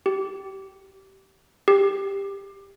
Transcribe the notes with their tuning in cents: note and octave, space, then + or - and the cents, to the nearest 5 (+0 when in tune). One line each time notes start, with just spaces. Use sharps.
G4 -20
G4 +15